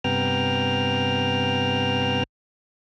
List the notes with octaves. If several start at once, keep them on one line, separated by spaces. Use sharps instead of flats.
G2 C3 B3 G5 A#5 F6